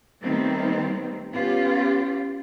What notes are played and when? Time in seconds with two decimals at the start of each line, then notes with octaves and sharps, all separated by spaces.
0.23 D#3 G3 A3 B3 C4
1.33 B3 C#4 F4 G4